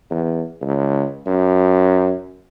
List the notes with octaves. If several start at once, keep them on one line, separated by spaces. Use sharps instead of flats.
E2
C#2
F#2